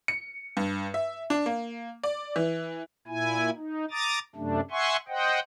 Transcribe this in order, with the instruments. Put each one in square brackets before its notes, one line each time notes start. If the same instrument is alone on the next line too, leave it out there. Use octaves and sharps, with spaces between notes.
[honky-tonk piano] C#7
G2
E5
D4
A#3
D5
E3
[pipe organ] A#2 E4 G#5
D#4
A#5 D6 D#6 A6
F#2 C3 A3 D4
E5 F#5 G#5 C6 C#6
C5 D#5 F#5 G5